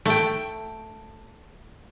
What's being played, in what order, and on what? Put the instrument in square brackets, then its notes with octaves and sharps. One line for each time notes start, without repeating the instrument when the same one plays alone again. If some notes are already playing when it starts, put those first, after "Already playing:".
[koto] A3 G5